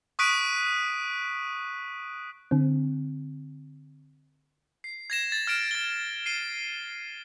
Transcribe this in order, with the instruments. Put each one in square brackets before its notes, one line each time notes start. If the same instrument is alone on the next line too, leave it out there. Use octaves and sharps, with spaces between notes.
[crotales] C#6 D#6 F#6 B6 D7 D#7
[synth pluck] D3 C4
[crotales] C7
G#6 A#6 E7
A6
F6 A6 D7 E7
A6 G7
C7 D#7 G7